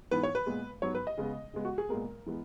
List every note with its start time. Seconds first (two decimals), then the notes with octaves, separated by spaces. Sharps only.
0.11 G#2 E3 B3 B4
0.23 C#5
0.35 B4
0.46 A#2 G#3 B3
0.82 G#2 F#3 B3 C#5
0.95 B4
1.07 D#5
1.17 C#3 G#3 B3
1.54 C#3 G#3 B3
1.65 F#4
1.78 G#4
1.89 A#2 G#3 B3 A#4
2.26 E3 G#3 B3